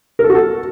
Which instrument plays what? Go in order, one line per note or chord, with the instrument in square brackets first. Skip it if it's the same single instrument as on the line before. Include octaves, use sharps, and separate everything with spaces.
[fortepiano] A#4
A4
F#4
A4